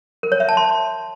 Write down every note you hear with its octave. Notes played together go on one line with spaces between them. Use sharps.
A#4
C#5
E5
A5
C6